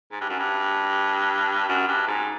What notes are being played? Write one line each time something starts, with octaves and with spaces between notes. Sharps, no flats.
G#2
G2
F#2
G2
F#2
G2
G#2